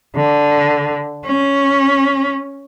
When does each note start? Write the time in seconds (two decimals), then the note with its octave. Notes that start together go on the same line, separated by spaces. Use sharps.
0.16 D3
1.26 C#4